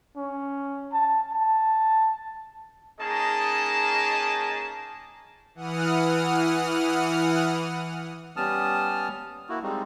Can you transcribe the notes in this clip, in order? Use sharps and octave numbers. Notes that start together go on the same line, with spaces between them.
C#4
A5
A5
A#3 C#4 D#4 G#4 D#5 A5
E3 F#5 D#6 F6
G3 B3 C#4 A5 D#6 F6
A#3 E4 F#4
G3 G#3 C4 D#4